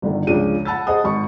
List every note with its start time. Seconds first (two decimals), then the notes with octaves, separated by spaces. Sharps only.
0.02 G1 D3 D#3
0.27 C#2 C#3 F3 D4 D#7
0.65 F#5 A5 B5 E6 A6
0.87 G#4 C5 D#5 F#5 A5 D#6
1.04 G#1 B5 C#6